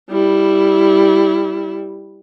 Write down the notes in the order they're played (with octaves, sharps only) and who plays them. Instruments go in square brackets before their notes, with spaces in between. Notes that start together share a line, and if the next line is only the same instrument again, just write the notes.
[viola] G3 E4